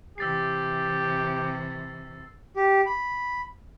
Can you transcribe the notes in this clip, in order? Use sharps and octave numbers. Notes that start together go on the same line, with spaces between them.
C3 E3 G4 E6 A6 C7
G4
B5